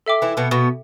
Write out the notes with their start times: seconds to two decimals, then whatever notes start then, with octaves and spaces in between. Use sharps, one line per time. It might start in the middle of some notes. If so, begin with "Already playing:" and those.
0.06 A4 E5 G5 D6
0.22 E3 E4
0.37 B2 B3
0.51 B2 B3